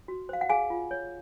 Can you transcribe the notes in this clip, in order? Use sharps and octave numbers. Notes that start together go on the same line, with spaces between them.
F#4
C5 F5
F#5
G#4 F5 G#5
F4
C#5